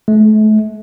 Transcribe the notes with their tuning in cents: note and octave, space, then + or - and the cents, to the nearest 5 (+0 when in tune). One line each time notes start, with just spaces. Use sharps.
A3 -35